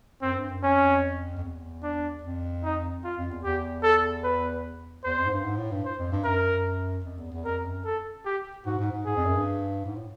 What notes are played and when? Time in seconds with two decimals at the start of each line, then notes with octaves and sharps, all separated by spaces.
0.22 F#2 C4
0.37 G2
0.49 F#2
0.63 F2 C#4
1.37 F2
1.44 E2
1.83 D4
2.23 F2
2.63 D#4
3.04 F4
3.18 F2
3.31 E2
3.44 E2 G4
3.83 A4
4.24 B4
5.04 E2 C5
5.18 F2
5.25 G#2
5.32 G2
5.44 G#2
5.57 A2
5.71 G2
5.85 C5
5.98 F2
6.12 G2
6.24 F#2 A#4
7.04 F2
7.18 E2
7.32 E2
7.45 F2 A#4
7.65 F#2
7.85 A4
8.26 G4
8.66 G#2 F#4
8.78 G#2
8.92 G#2
9.06 G#2 G#4
9.16 F2
9.26 F#2
9.35 G2
9.85 G#2
9.96 A2